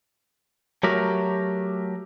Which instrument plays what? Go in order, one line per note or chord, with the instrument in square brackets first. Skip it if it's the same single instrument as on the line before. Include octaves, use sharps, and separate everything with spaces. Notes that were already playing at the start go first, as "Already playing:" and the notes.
[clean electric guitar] F#3 A3 F#4 G4 A#4